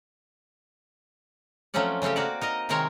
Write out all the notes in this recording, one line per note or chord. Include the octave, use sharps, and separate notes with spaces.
F3 F#3 A3 C4 C#4 D5
C#3 A3 C4 C#4 G4
A#3 F#4 D5
D#4 A#4 D#5
C3 D#3 G#3 C4 A#4 C#5